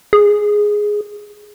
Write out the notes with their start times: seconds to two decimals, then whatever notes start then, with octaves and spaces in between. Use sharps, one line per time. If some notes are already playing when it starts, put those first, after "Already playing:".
0.13 G#4